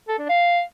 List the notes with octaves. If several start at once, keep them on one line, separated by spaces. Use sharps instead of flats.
A4
D4
F5